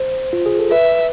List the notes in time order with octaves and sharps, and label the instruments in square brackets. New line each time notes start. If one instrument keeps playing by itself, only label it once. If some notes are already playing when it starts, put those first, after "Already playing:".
Already playing: [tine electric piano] C5
F4
G#4
A4
[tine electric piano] B4 [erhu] E5